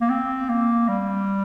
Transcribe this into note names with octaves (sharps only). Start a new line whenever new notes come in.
A#3
C4
A#3
G3